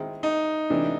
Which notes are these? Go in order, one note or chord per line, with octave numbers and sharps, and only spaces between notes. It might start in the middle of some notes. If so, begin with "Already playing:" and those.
Already playing: D#3 G#3 C4 E4
D#4
C3 E3 A3 D4